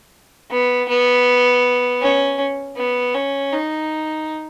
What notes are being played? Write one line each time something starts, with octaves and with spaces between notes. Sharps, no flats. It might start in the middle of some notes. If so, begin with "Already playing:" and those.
B3
B3
C#4
B3
C#4
D#4